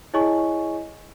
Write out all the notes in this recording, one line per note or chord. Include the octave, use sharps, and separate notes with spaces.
E4 G#4 C#5 D#5 G#5 C#6